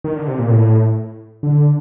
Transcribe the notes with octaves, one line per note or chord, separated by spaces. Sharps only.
D#3
D3
C3
A#2
A2
D3